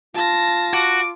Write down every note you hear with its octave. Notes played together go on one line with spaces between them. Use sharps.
F4 A5 A#6
F#4 D6